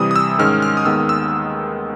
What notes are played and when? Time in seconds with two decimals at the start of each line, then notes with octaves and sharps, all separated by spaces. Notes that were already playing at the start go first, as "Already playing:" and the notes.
Already playing: C3 E3 G3 D#6
0.11 D#6
0.16 E6
0.39 G#2 D#3 G#3 C#4 F6
0.62 F6
0.77 D#6
0.86 D#2 D#3 G#3 B3 E6
1.09 E6